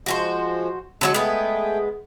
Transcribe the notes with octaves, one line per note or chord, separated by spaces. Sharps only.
F3 G#3 F#4 G4 C5
D3 F#3 G#3 F#4
G#3 A3 B3 G#4 G5